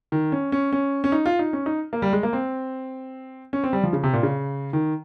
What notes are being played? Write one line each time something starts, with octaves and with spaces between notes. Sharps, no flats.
D#3
C#4
C#4
C#4
C#4
D#4
F4
D#4
C#4
D#4
A#3
G3
G#3
A#3
C4
C#4
C4
G3
F3
C#3
C3
A#2
C#3
D#3